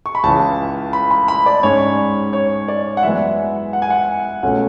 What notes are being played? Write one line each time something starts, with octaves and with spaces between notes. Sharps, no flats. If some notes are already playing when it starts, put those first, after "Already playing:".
C#6
B5
C#2 C#3 E3 A5
B5
B5
B5
D5
G#2 G#3 C#4 C#5
C#5
D5
F#5
F#2 E3 G#3 B3 E5
F#5
G#5
F#5
C#2 B2 A3 C#4 F#5